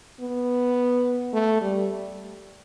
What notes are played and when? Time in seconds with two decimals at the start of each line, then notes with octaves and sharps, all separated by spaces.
0.21 B3
1.33 A3
1.61 G3